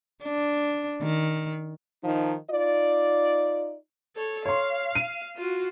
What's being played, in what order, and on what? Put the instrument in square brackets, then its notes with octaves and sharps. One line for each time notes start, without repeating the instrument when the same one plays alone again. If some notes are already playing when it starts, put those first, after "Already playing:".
[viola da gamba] D4
D#3
[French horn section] D#3 F3 D#4
D#4 F4 D5
[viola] A4 C#5
[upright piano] C#5 C6 [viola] F5
[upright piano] D#7
[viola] F4 F#4